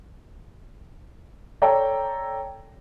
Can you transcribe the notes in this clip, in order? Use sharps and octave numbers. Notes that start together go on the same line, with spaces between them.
A4 C#5 D5 G5 A5 A#5